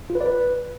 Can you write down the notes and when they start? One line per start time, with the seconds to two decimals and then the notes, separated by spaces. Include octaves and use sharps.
0.10 F4
0.15 B4
0.21 D5
0.26 B4